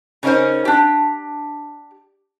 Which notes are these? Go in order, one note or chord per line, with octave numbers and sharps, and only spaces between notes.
C#3 C#4 D#4 A#4 C5
D4 G4